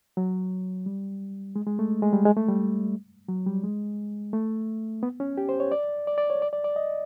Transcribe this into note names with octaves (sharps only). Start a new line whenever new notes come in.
F#3
G3
G#3
G#3
A3
G#3
G3
G#3
A3
G3
F#3
G3
G#3
A3
B3
C#4
G4
C5
C#5
D5
D5
D5
C#5
D5
D5
D5
D#5